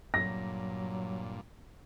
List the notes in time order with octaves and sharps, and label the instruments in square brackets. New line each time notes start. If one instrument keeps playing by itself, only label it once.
[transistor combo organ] G2 A#2 [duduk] F#3 [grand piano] A#6